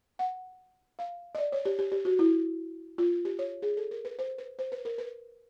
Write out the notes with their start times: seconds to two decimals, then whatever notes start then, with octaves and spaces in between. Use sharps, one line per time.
0.19 F#5
0.99 F5
1.35 D#5
1.38 D5
1.52 C#5
1.65 G4
1.79 G4
1.92 G4
2.05 F#4
2.19 E4
2.98 F4
3.25 G4
3.39 C#5
3.62 G#4
3.77 A4
3.91 A#4
4.05 B4
4.19 C5
4.38 B4
4.59 C5
4.72 B4
4.85 A#4
4.98 B4